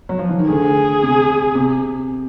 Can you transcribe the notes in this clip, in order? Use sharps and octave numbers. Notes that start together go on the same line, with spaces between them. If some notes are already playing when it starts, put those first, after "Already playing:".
F#3
F3
E3
D#3
D2 D3 G#4
C3
C3